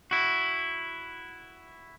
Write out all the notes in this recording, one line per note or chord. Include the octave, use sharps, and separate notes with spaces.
E4 F#4